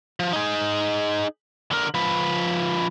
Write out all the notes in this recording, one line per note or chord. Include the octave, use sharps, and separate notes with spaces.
F3
D#4 G#4
D3 A#4
F3 B4